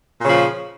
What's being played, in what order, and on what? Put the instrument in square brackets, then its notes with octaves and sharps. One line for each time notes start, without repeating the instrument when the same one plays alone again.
[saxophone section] A#2
C#3
F3